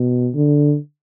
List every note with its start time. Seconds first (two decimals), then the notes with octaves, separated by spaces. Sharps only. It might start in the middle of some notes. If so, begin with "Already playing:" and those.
Already playing: B2
0.35 D3